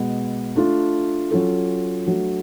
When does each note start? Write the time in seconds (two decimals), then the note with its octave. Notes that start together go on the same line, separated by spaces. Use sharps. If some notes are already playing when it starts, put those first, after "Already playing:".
Already playing: B2 G#3 B3
0.56 A3 D4 F4
1.31 F#3 C#4 F4 A4
2.06 F#3 A3 D4 F#4